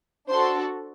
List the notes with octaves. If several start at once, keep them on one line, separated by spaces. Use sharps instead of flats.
D4 F#4 A4 C5 C6